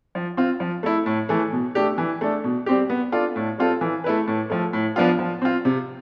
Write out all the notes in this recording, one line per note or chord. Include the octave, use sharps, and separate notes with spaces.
F3
C4 F4
F3
A3 E4
A2
E3 A3
B2
A3 D4 G4
E3
A3 D4
B2
G3 C4 G4
B3
D4 F4 A4 D5
A2
G3 C4 F4 A4
E3
A3 E4 B4
A2
F3 A3
A2
F3 B3 D4 F4
F3
C4 F4
C3